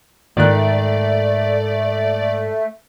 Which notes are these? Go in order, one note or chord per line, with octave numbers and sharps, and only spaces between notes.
G#2 D#3 A3 D5 F#6